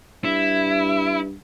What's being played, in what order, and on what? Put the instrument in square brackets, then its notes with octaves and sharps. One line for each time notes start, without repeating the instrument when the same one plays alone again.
[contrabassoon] G2 [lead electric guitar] E4